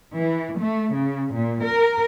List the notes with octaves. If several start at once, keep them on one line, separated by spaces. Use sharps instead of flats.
E3
A3
C#3
A#2
A#4